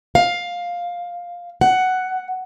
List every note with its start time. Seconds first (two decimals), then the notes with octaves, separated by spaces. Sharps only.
0.15 F5
1.61 F#5